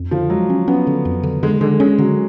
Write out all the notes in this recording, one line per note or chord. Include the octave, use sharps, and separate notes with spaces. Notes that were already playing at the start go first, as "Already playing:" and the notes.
Already playing: F2
D3 F3
F#3 G#3
C#4
B3 C#4
D3
F2
D3
D3 G#3
D3 G#3
G#3 C#4
D3 F#3